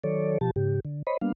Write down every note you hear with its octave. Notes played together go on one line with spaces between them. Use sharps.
D#3 F#3 A4 C#5 D5
B2 F3 G4 A5
G#2 C#3 G4
D3
C5 C#5 D#5 B5
G3 A#3 B3 D4 F5